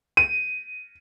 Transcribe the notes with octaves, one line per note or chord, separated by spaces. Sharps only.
D#7